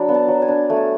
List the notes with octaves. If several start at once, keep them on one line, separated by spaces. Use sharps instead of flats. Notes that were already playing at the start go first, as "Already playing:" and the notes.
Already playing: F#3 D4 B5
B3
A5
F#3
G#5
D4
A3 G#5